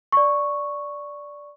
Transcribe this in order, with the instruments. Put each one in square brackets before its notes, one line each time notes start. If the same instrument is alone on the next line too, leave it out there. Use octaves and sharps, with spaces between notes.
[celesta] D5 C#6